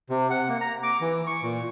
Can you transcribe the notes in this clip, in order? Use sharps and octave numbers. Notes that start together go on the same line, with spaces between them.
C3
F#5
A#3
A#5
D6
E3
C#6
A#2